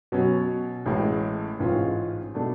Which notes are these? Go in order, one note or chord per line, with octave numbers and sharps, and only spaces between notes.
B2 F#3 C#4
A1 A2 G#3
A1 G#2 G#3 C#4 F4
B2 A3 D4